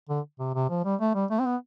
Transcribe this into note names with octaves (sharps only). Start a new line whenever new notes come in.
D3
C3
C3
F3
G3
A3
G3
A3
C4
B3